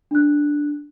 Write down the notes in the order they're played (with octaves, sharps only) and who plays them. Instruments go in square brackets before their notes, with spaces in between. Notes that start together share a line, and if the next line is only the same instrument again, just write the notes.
[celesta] D4 F#6